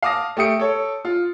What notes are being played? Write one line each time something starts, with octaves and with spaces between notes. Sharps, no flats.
F5 A5 D6 D#6 A#6
A3 G4 D#6 C#7 D7
A4 C#5
F4